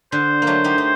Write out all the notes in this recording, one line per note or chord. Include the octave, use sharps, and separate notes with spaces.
D3 C5
A#3
F#3 A3
D#4 G4
D#4